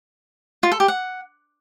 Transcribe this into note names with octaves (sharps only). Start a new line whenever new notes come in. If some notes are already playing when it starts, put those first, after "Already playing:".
F4
A4
G4
F#5